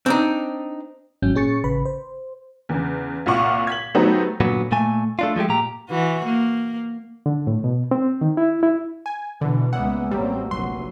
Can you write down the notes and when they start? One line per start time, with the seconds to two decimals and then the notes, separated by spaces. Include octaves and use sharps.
0.06 C4 D4 D#4
1.22 G#1 G#2 F#3 C#4 G6
1.35 A#2 C#4 G#4 C#6 A6 C#7
1.64 A1 C#3 B4 B5
1.85 C5
2.69 E2 C#3
3.26 C2 A#2 F4 F#5 C#6 D6
3.67 G#6 B6 F#7
3.95 F#3 A3 B3 D#4 G4 C5
4.41 A#2 D3 F#3 B3
4.72 A#2 A3 G#5
5.19 A3 D4 F4
5.36 F3 G#3 A3 G4
5.49 A#2 G4 A#5
5.89 E3 F#4
6.25 A#3
7.26 D3
7.47 A2
7.64 B2
7.91 C4
8.21 D#3
8.37 E4
8.63 E4
9.06 G#5
9.41 B2 D3 E3
9.73 C#2 A#2 E3 G#3 B3 E5 F#5
10.11 A1 F#3 G3 A#3 C4
10.51 F1 A#1 F#2 F#4 B4 C6